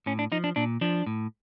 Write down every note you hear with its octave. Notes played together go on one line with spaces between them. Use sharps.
A2 C#4
D4
F3 D#4
D4
A#2 D4
F3 D4
A2